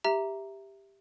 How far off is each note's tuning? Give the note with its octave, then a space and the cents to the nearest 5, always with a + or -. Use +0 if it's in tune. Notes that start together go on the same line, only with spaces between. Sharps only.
G4 +5 E5 +0 A#5 +0